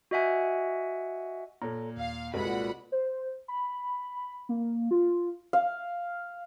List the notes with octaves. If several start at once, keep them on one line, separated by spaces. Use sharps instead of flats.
F#4 D#5 E5 F#5 G#5
A#2 A4 C#5 A#5
D#2 F5
C2 A#2 G#3 F#4 A4 B4 F#5 B5
C5
B5
A#3
F4
F5